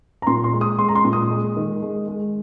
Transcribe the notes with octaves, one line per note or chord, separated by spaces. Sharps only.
A#5
A#2 C6
C6
G#3
D#6
G#3 C6
A#5
C6
A#2
D#6
G#3
D#3
G#3
G#3